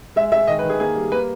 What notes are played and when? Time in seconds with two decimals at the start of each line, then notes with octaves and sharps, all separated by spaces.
0.16 G#3 E5
0.32 G#3 E5
0.48 D#3 D#5
0.59 B4
0.63 D#3
0.70 G#4
0.80 A#3 G#4
0.96 G3
1.11 A#3 B4